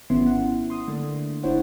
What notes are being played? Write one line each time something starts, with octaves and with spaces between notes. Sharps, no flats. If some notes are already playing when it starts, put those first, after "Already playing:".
G#1 D#3 B3 C#4 E4 C6
F#5
C6 D#6
D3 A3 A#3 D4
G#1 D4 E4 C5 C#5 F#5